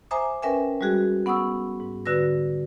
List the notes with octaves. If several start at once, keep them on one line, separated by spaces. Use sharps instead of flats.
C5 E5 G#5 A#5 D6 D#6
C#4 A#4 B4 E5 G5 G#5
G3 G#3 F#4 G#4
B3 F#5 C#6 D#6 E6
G#2
D3 F#4 B4 E6 A#6